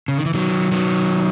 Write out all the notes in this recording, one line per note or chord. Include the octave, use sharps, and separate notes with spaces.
C#3
D#3
E3
D#3 F#3
D#3 F#3